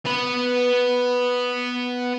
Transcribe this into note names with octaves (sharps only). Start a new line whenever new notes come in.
B3 B4